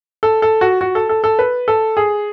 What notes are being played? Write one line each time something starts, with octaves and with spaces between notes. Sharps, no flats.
A4
A4
F#4
F#4
A4
A4
A4
B4
A4
G#4